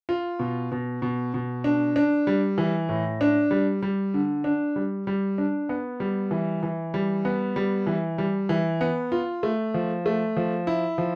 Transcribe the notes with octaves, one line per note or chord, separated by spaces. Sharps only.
F4
B2
B2
B2
B2
D4
D4
G3
E3
A2
D4
G3
G3
D3
D4
G3
G3
D4
B3
G3
E3
E3
G3
B3
G3
E3
G3
E3
B3
F4
A3
F3
A3
F3
E4
F3